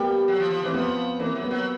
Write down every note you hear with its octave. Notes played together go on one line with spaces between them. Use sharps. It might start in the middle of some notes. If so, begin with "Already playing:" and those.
Already playing: G3 A#3 B3
F#3
F3
F3
E3 C4
F3 B3
E3 A#3 C4
F#3
B3
F#3